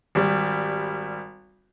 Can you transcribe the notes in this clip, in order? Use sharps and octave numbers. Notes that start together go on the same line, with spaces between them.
G#1 G3